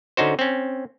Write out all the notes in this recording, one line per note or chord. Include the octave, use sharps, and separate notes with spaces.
D3 C#4 D#4 F#4 C5
C4 C#4